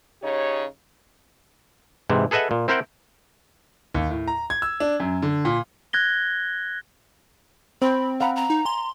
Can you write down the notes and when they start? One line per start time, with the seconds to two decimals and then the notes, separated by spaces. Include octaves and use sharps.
0.22 C#3 D#4 G4 C#5
2.10 G#2 C3 E3
2.31 G#4 A4 B4 D#5 E5 F#5
2.51 A#2
2.68 C4 E4 A#4 C5 F#5 G5
3.94 D#2
4.10 A2
4.28 A#5
4.50 G#6
4.62 E6
4.80 D4
5.00 F#2
5.22 D3
5.45 A#2
5.93 F#6 G#6 A#6 G7
7.82 C4 C5 B5
8.21 F5 F#5 A#5 B5
8.36 A#5
8.50 D#4
8.65 G#5 C6